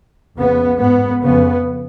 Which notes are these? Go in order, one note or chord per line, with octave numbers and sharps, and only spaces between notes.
F2 C#3 B3
G#2 B3
F2 C#3 B3